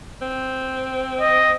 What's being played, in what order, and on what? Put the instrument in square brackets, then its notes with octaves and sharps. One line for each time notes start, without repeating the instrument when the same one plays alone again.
[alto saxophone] C4
[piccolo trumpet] D#5